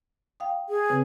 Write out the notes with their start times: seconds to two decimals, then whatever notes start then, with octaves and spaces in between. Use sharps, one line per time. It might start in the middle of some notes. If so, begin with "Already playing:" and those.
0.40 F5 G5 D#6
0.69 G#4
0.89 C#3 C4 B4